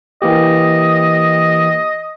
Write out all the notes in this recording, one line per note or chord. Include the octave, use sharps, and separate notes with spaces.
E3 A#3 G4 D#5